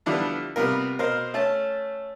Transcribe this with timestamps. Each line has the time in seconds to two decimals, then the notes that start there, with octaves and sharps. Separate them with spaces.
0.06 D3 F3 G3 B3 D4 E4
0.56 C3 G3 B3 F4 A#4
0.99 B2 A#4 C5 F5
1.34 A3 C#4 A5